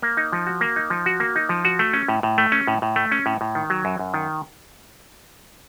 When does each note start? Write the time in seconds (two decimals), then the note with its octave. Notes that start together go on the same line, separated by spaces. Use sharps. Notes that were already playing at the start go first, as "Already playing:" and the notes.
0.02 A#3
0.17 D#4
0.33 F3
0.47 F#4
0.61 A#3
0.76 D#4
0.90 F3
1.06 F#4
1.20 A#3
1.36 D#4
1.49 F3
1.65 F#4
1.79 A3
1.93 C#4
2.08 A2
2.23 A2
2.38 A3
2.52 C#4
2.68 A2
2.82 A2
2.96 A3
3.12 C#4
3.26 A2
3.41 A2
3.55 D#3
3.70 F#3
3.85 F#2
3.99 F#2
4.14 D#3